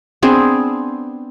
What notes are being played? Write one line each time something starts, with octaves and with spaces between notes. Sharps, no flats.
B3 C4 D4 G#4